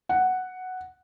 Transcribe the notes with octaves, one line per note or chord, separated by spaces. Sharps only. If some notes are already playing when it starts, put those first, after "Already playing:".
F#5